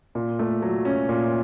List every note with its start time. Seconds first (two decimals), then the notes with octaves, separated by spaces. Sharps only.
0.15 A#2
0.39 A3
0.62 F#3
0.85 C#4
1.09 A#2